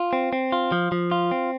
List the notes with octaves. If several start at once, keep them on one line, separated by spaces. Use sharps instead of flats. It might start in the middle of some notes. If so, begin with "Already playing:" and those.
Already playing: F4
C4
C4
F4
F3
F3
F4
C4